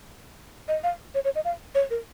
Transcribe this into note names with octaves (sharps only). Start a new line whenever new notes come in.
D#5
F5
C#5
C#5
D#5
F5
C#5
A#4